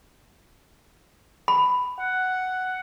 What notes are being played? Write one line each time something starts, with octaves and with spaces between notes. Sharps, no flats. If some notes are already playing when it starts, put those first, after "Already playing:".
B5
F#5